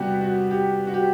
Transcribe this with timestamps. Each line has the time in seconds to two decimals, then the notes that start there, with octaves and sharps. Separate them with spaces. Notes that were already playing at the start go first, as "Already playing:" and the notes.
Already playing: C3 G3 B3 F#4 G4
0.21 F#4
0.51 G4
0.87 F#4
0.94 G4